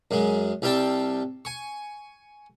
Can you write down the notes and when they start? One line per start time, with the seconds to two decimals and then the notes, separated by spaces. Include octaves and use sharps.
0.11 F#2 G#3
0.62 C2 G3 C4 G5 A5
1.45 G#5 C#6